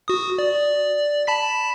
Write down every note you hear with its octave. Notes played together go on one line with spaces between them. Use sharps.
F#4 D#6
D5
A5 B5 B6